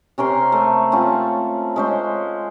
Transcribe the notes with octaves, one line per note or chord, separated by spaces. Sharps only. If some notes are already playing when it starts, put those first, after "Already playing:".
C3 C#4 A#4 C6
A3
C4 C#4 F4 A5
G#3 C#4 C5